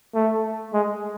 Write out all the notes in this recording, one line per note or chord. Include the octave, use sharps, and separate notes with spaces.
A3
G#3